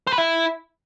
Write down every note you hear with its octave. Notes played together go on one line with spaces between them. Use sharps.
C5
B4
E4